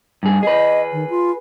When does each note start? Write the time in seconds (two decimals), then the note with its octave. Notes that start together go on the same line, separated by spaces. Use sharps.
0.23 G2 G#4
0.43 G#4 B4 D#5
0.92 D#3
1.10 F4